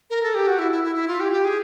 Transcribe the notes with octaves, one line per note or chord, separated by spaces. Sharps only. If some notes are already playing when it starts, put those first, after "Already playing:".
A#4
A4
G4
F#4
E4
E4
E4
E4
F4
G4
G4
G#4